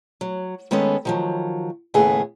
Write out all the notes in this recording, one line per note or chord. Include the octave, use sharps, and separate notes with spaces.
F#3
D#3 G#3 B3 C#4 A4 B4
D#3 F3 F#3
D#2 A2 C#3 A3 B3 G#4